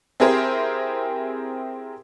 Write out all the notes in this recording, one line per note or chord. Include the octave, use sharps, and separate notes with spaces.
C4 E4 G4 G#4 A#4 C5